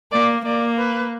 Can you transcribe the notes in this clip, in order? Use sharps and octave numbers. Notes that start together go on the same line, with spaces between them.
A#3 D5
A#3 D5
B4